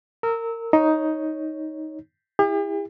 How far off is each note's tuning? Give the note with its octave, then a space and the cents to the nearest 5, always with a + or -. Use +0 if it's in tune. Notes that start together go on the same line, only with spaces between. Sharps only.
A#4 -25 E6 -20
D#4 +10 C#5 +0
E4 +0 G4 +45